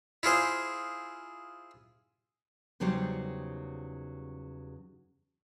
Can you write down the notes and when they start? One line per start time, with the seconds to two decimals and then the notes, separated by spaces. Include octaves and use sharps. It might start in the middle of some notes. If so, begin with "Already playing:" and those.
0.23 E4 F4 G#4 C5
2.80 E2 C#3 F#3 G3 D#4 C5